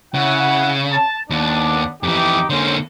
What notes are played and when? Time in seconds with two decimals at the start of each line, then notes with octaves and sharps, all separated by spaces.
0.14 C#3 E4 F#5
0.93 A5
1.30 D#2 B3 D4
2.03 F2 E3 D#4 G4
2.50 D3 A#3 C#4 C5